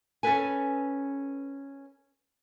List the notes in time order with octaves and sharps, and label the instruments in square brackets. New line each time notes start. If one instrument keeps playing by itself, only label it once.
[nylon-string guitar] C#4 A4 B4 G#5